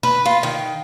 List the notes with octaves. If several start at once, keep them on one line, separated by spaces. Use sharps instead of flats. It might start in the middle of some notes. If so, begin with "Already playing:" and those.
B4
F4
D#3